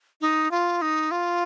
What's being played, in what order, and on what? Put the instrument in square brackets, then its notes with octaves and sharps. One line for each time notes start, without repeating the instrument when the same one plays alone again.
[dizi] D#4
F4
D#4
F4